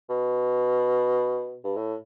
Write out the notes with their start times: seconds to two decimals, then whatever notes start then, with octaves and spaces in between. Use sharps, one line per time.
0.10 B2
1.64 G2
1.76 A2